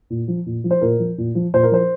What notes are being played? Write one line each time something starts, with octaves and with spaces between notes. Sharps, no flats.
A#2
F3
A#2
F3
C5
A#2 A#4
F3
A#2
F3
A#2 C5
A#4
F3 C5